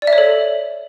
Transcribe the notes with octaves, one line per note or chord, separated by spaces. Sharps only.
D5
E5
C#5
A4